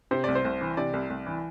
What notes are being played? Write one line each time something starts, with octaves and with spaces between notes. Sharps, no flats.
C3 C5
C2 D5
C5
C2
E3
C3 D5
C2
C2
E3